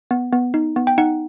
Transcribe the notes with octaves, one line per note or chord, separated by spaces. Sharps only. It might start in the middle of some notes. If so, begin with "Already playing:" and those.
B3
B3
D#4
B3
G5
D#4 F#5